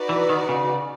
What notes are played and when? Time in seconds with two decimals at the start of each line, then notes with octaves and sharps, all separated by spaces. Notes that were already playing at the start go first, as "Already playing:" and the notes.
Already playing: D#4 F#4 B4 D5
0.09 E3
0.29 D#3
0.49 C#3